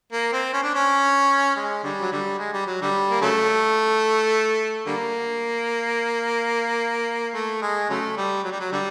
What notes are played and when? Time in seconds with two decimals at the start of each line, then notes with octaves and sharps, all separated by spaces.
0.12 A#3
0.33 C4
0.53 C#4
0.63 D4
0.74 C#4
1.56 G#3
1.83 D3 G3
2.01 F#3
2.12 D3 G3
2.38 G#3
2.53 G3
2.66 F#3
2.81 D3 G3
3.10 A#3
3.21 C#3 F#3 A3
4.86 D3 G3 A#3
7.34 A3
7.62 G#3
7.90 C#3 F#3 A3
8.17 G3
8.44 F#3
8.52 G3
8.60 F#3
8.72 D3 G3